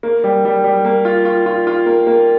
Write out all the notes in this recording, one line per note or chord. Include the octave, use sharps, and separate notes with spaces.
A#3
G3
G3
G3
A#3
F4
F4
F4
F4
A#3
A#3